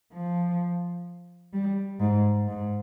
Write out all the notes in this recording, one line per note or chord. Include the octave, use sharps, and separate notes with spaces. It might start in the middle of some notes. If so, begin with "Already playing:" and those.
F3
G3
G#2
G#2